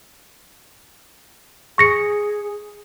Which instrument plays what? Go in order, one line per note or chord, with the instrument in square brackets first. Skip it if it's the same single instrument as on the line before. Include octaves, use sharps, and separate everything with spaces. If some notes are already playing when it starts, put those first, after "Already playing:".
[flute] G#4 [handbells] C#6 A#6 C#7